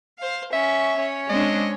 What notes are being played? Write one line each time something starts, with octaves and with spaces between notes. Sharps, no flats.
C5 F5
C#4 E5 C#6
C#4 C#5
G#3 C4 D4 D#5